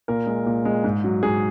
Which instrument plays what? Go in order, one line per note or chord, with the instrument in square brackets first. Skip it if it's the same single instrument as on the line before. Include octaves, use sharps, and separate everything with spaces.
[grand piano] A#2 A#4
G#3
A#2
G#3
G#2
F#3
G#2 G#4